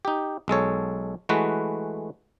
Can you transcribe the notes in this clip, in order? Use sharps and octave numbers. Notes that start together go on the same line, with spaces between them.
D#4 G4
B1 G#3 A4 C#5
E3 G#3 A3 F#4 B4